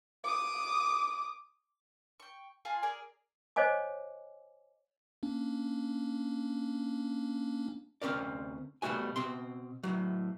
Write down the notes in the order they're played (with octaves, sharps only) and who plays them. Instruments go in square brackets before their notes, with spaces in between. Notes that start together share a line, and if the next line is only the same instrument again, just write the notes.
[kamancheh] D6 D#6
[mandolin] G5 C#6
F4 G#4 G#5 A5
G#4 A#4 D5
[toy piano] C5 C#5 D#5 F5 G#5 D6
[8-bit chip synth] A#3 C#4 D4
[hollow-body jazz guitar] D2 C4 C#4 A#4 D5
B2 G3 A3 F#4 G#5
B2 C4 C6
A2 F#3